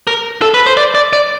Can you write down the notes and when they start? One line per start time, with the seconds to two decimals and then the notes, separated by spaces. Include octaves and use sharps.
0.07 A#4
0.42 A4
0.54 B4
0.67 C5
0.77 D5
0.95 D5
1.13 D5